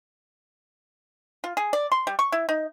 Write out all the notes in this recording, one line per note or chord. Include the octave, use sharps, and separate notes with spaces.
F4
G#4
D5
C6
G3
C#6
E4
D#4